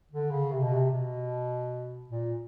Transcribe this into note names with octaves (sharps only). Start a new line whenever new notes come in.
D3
C#3
C3
B2
C3
B2
A#2